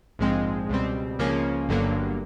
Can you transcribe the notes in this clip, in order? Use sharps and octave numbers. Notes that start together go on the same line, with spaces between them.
A#1 G#2 F3 G#3 C4
C#2 B2 G3 C4
C#2 C#3 F3 A#3 C#4
G1 G2 D3 F#3 A#3